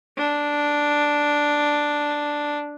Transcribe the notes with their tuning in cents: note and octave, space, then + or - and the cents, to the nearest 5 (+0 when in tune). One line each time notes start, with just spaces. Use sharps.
D4 +0